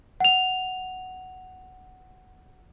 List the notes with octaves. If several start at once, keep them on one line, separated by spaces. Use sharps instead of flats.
F#5 F7